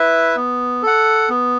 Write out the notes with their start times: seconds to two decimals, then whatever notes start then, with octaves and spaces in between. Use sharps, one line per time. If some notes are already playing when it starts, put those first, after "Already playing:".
Already playing: E4 B4 E5
0.36 B3
0.83 A4 F#5
1.29 B3